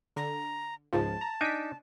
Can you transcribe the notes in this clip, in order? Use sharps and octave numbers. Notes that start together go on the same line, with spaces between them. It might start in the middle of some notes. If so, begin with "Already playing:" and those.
D3 A#5
C#2 G#2 F3 A5
A#5
D4 D#4 G#5 B6 D7